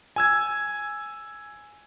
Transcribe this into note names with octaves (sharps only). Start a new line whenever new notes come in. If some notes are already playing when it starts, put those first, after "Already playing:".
G#5 E6 G#6